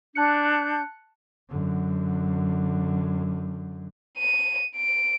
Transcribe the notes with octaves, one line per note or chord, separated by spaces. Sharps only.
D4 A5 F#6 G6 C#7
F#2 D3
D#7
D7